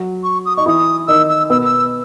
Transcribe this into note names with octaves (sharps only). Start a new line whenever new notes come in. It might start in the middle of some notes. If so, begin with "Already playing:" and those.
Already playing: F#3 F#4
C#6
D#6
D#4 C#6
E3 E4 D#6
D#3 D#4 E6
E6
B2 B3 E6
E6